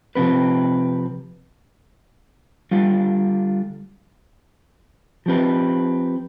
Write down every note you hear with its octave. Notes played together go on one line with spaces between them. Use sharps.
C3 F3 C4 G4 B4
D3 G3 D4 F4
F3 C4 G4 B4